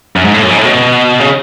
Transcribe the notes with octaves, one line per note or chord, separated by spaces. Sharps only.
F#2
G#2
A2
F#2
G#2
A2
B2
C#3